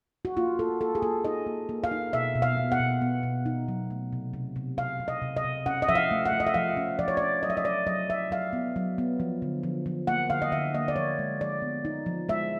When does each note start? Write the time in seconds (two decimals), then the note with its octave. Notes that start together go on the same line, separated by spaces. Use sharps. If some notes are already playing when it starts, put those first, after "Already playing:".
0.25 F#4
0.36 A#3 F4
0.59 A#3 A4
0.81 A#3 A4
0.95 G#4
1.02 A#3 A4
1.25 D#4 D#5
1.47 A#3
1.69 A#3
1.84 F5
1.91 D#4
2.13 B2 E5
2.35 B2
2.42 F5
2.57 B3
2.72 F#5
2.80 B2
3.02 B3
3.23 B2
3.46 D#4
3.68 F#3
3.90 A3
4.13 C3
4.34 C3
4.56 C3
4.78 C3 F5
5.00 C3
5.08 D#5
5.22 C3
5.36 D#5
5.44 C3
5.66 C#4 F#5
5.82 D#5
5.89 F3 E5
5.95 F5
6.11 A3
6.26 F#5
6.32 A3
6.40 D#5
6.47 E5
6.54 F3 F5
6.77 C#4
6.99 F3 D5
7.08 C#5
7.17 C#4 D5
7.43 F#3 D#5
7.50 E5
7.57 D#5
7.65 F#3 D5
7.87 F#3 D#5
8.09 F#3 E5
8.31 F#3 F5
8.53 B3
8.76 F#3
8.98 B3
9.20 F3
9.42 D3
9.63 F3
9.86 F3
10.07 A#3 F#5
10.30 D3 F5
10.42 D#5
10.52 D3 E5
10.74 A#3 D#5
10.88 D5
10.96 F3 C#5
11.19 G#3
11.41 F3 D5
11.62 B3
11.85 D#4
12.06 F3
12.29 G#3 E5